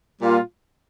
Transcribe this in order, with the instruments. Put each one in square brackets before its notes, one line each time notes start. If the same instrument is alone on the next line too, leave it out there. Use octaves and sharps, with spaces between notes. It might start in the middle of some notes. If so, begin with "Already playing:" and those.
[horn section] A#2 G3 A#3 F4